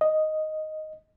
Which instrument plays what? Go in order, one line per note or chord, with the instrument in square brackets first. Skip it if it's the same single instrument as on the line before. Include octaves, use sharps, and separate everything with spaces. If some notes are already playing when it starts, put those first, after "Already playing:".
[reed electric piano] D#5